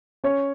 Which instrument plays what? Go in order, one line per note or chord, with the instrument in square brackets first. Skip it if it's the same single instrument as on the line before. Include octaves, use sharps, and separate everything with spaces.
[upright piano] C#4 C#5